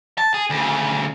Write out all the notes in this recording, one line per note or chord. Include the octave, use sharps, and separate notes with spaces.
A5
G#4
D2 C#3